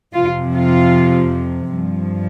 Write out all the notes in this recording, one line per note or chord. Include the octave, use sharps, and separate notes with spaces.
F2 C3 F3 F4
F4
G2 F3